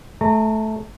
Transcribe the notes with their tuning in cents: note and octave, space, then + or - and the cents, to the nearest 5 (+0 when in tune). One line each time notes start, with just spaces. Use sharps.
A3 -15 A#5 -35